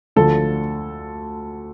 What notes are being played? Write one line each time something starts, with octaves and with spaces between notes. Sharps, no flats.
D2 D3 F3 A4